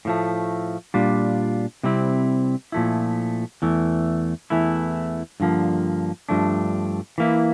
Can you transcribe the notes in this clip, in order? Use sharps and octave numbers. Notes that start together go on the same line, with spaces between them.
A2 F3 A3
A#2 G3 D4 F4
C3 G3 C4 E4
A#2 F3 A3 E4
E2 E3 A3
E2 E3 A3 E4
G2 D3 F3 A#3
G2 F3 A3 D4
E3 A#3 E4